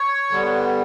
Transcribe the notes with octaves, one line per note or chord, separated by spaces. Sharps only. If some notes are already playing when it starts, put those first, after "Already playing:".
Already playing: C#5
D3 G3 B3